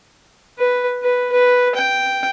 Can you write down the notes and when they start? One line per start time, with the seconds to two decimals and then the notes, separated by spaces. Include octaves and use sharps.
0.58 B4
1.03 B4
1.32 B4
1.75 G5